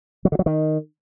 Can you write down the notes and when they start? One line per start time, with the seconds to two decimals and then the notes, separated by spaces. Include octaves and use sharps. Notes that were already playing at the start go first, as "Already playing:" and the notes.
0.25 F#3
0.32 D3
0.39 F#3
0.46 D#3